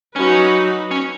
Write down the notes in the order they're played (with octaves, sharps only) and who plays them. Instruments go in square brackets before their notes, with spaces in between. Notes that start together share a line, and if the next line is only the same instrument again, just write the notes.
[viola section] F#3 D#4 F#4 B4 [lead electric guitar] C#4
[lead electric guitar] C#4